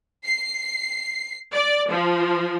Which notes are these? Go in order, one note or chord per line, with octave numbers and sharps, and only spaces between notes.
C7
D5
F3